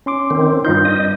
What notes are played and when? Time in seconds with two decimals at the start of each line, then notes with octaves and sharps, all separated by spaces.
0.06 C#4 C6 D6
0.30 D#3 C4
0.65 G2 D#4 F4 G6
0.85 D#5